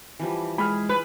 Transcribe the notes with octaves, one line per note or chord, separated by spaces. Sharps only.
E3 F3 G3
G#3 G#4 B5 F6
B4